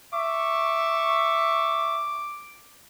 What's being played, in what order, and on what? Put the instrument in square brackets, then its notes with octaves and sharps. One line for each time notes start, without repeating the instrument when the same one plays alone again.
[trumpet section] E5 C#6 [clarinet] D6